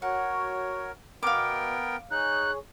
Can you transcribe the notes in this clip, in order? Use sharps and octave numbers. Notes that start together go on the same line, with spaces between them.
F#4 A#4 C#5 F#5
B2 B3 A#4 F5 G5 D6
D#4 G#4 C#5 F#6